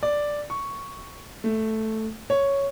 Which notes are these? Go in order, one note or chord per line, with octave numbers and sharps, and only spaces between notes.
D5
C#6
A3
C#5